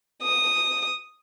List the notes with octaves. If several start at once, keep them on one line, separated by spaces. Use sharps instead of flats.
D#6